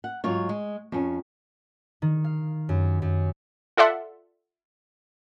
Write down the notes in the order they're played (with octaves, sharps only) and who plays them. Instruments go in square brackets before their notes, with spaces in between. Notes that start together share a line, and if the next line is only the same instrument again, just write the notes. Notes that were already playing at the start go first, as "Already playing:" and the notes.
[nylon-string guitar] F#5
G#2 F#3 F4 C#5
G#3
F2 C#4
[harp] D#3
F5
F#2
F#2
[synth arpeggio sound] F4 A4 D5 E5 F#5 C6